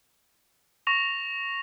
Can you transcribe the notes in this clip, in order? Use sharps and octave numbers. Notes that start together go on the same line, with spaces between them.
C#6 A#6 F7